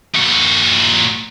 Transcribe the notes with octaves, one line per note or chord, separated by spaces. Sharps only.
A#2 F#4